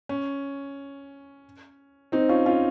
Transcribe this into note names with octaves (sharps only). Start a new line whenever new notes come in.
C#4
C4 D#4
C#4 F4
C#4 F4